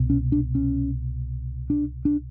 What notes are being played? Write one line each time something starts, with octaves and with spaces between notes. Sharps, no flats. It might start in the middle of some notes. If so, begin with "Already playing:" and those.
Already playing: C2 B2
C#4
D4
C#4
D4
D4